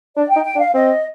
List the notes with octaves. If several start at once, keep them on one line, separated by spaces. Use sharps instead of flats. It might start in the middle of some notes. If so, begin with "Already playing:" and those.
D4 D5
G5
D#4
G5
D4
F5
C4 D#5